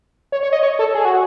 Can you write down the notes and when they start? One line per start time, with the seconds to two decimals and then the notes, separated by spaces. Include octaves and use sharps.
0.32 C#5
0.43 C#5
0.52 D#5
0.63 C#5
0.79 A4
0.95 G#4
1.05 F#4